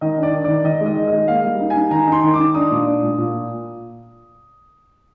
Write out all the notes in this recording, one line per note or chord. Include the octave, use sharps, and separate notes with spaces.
D#3 D#5
D4
D5
D#3
D#3 D5
D#3 D#5
G#3
D#5
D#3
D#5
G#3
A#3 F5
G3
D#4
G#5
D#4
D#3 A#5
D#4
C6
D#3
D6
D#4
D4 D#6
A#2
D4
A#2
A#2